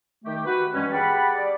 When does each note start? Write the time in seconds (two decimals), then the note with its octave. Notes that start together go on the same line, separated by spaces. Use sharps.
0.24 D#3 A3 G4
0.45 F#4 B4
0.73 G2 E3 G#3 C#4
0.91 G4 G#4 F#5 G5 A5 B5
1.35 D5